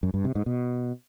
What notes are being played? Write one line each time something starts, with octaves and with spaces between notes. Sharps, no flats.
F#2
G2
C3
G#2
B2